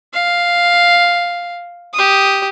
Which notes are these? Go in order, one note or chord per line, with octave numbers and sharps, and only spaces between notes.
F5
G4 D#6